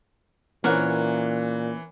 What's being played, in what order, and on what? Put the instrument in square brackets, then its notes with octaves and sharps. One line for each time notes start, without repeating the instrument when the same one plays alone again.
[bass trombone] A#2 [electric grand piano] E3 [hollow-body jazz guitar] A#3 C4 C#4 [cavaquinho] A#4 C#5 F#5